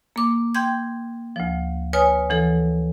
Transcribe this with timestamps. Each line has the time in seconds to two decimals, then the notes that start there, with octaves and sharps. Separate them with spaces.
0.16 A#3 D6
0.55 G5 C6 G6 G#6
1.36 D2 F3
1.93 B4 C#5 G#5 D#6 F6
2.29 D2 E3 A4